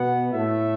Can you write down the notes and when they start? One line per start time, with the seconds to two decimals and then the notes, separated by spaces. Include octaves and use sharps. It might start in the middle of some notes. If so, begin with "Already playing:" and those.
Already playing: B2 B3 F#5
0.33 A2 A3 E5